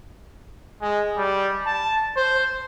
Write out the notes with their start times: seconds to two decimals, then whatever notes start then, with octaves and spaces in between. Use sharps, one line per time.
0.81 G#3
1.17 G3
1.67 A5
2.17 C5